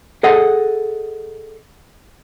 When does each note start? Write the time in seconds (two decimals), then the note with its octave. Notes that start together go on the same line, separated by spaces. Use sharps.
0.23 G#4 A4 D#5 F#5